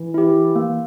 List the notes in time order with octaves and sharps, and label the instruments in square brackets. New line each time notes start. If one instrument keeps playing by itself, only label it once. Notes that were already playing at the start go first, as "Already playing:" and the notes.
Already playing: [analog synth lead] E3
[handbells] E4 G4
A#3